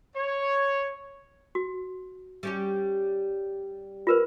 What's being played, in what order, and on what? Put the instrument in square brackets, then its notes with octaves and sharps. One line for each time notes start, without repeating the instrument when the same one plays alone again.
[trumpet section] C#5
[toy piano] F#4
[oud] G3 C#4 G4
[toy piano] F4 A#4 B4